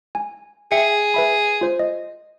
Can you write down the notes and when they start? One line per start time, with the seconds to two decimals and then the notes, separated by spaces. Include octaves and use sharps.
0.15 G#5
0.72 G#4 E5 G5 C#7
1.14 B4 E5 B5
1.61 F4 C5
1.79 D#5